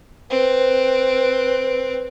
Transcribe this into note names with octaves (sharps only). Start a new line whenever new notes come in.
C4 B4